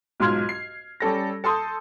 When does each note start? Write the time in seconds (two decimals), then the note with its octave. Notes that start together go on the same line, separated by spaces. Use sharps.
0.20 B1 G#2 F4 C6 F6 G#6
0.49 C7
1.00 G3 C#4 A4 A#6
1.44 A4 A5 C6 D#6 G6